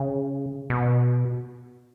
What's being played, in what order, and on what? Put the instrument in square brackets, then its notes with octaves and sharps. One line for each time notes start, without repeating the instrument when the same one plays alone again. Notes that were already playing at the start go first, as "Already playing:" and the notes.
Already playing: [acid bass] C#3
B2